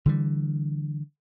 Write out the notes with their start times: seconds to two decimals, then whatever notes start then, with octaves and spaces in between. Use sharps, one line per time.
0.06 D3 E3 G3